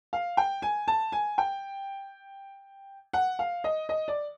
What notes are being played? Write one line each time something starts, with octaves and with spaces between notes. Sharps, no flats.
F5
G5
G#5
A5
G#5
G5
F#5
F5
D#5
D#5
D5